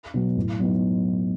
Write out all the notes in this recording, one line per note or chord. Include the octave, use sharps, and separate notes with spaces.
B2 F#3
A2
F#3 B3 D#4